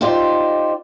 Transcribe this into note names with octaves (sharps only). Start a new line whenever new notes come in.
D#4 F4 G4 C5 D5